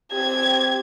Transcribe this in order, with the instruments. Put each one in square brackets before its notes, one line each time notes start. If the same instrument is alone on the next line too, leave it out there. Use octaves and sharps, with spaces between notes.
[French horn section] C4 G4 [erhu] G#6